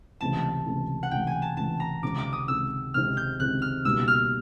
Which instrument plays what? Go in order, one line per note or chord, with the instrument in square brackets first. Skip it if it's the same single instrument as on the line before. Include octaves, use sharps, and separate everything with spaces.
[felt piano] C#2 C3 E3 A3 [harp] A5
[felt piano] C#2 C3 E3 A3
[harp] F#5
[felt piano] C#2 C3 E3 A3 [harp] G5
[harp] G#5
A5
[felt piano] C#2 C3 E3 A3 [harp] A5
[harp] A#5
[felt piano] C#2 C3 D#3 G#3 C4 [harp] D6
[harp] D6
D#6
[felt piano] C#2 C3 D#3 G#3 C4 [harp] E6
[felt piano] C#2 C3 D#3 G#3 C4 [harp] F6
[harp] G6
[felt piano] C#2 C3 D#3 G#3 C4 [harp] F#6
[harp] F6
[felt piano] C#2 B2 G3 A#3 D#4 [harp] E6
[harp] F6